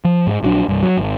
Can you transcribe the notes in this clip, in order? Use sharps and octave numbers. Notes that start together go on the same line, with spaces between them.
F3
G#2
A#1 F#3 D4
C2 G2
F#3
G#1